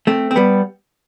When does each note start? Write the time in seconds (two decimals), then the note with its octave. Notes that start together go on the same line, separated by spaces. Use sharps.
0.07 A3 C4
0.31 C4
0.36 G3 B3